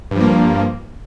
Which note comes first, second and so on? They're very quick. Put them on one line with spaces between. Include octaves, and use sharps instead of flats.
G2 F3 A#3